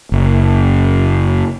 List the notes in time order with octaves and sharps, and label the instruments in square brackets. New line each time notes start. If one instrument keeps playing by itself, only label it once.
[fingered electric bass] F#1